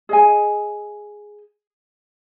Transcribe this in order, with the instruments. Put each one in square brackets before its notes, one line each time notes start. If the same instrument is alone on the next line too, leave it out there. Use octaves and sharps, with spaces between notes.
[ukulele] G#4 D#5 G#5